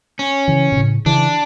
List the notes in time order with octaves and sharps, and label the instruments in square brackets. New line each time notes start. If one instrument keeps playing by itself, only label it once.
[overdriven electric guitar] C#4
[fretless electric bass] C#3 E3
B2
A2 C#3
[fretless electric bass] C#3 E3 [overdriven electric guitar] D4